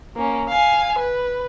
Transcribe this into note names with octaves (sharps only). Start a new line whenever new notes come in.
A#3 C#4
F5 G#5
B4